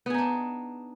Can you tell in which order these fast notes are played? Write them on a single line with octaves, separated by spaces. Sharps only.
B3 G#4 D#4 D4